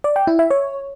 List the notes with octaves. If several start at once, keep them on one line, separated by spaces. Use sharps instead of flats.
D5
G5
E4
E5
C#5